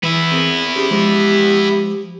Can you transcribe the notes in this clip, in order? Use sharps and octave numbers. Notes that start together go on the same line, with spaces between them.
E3 B3 E4
C4 G#4 A#4
C#4 D4 G4 G#4 C5
F3 G#3 G4